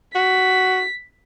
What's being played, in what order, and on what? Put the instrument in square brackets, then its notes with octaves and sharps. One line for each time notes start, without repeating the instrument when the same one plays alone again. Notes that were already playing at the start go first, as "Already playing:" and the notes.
[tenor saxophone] F#4 [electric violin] B6